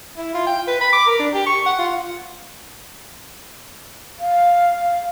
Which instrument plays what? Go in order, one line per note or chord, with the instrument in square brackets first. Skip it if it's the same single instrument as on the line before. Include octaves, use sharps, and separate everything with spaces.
[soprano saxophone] E4
F4
G5
B4
B5
D6
A#4
D4
G4
C#6
F#5
F4
[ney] F5